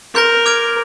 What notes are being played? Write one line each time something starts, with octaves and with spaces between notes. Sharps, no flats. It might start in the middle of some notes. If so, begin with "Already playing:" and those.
A#4 C6 G6 A#6
D6 F6 G#6 D7